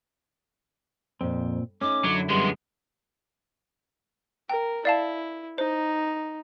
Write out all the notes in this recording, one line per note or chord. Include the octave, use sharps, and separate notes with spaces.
F2 A#2 C4
A3 C#4 D#4 D6
F#2 D3 F#3 E4
G3 G#3 B3 C6
A#4 G5
E4 D5 F5 A5
D#4 C5